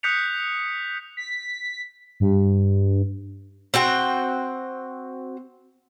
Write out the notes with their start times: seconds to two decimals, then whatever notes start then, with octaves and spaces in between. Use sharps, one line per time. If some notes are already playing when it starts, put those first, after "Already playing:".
0.03 D#6 F#6 G6 B6 C#7 F7
1.17 B6
2.20 G2
3.74 C4 F#4 G5